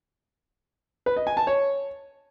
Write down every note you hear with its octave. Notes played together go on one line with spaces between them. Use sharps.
B4
D#5
G#5
A5
C#5